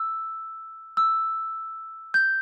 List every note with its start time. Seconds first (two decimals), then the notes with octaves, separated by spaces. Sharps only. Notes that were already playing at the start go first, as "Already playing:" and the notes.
Already playing: E6
0.97 E6
2.14 G6